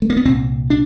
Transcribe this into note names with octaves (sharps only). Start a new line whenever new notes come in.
A3
A#3
B3
C2 A#2 C4
D4